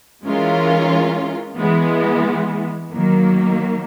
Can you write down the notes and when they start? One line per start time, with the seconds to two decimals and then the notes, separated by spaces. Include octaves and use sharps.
0.24 E3 G#3 C#4 F4 A#4
1.58 E3 G#3 B3
2.93 D#3 F#3 A#3